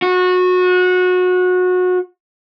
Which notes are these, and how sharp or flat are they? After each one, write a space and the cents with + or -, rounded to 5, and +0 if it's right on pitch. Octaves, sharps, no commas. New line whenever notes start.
F#4 -25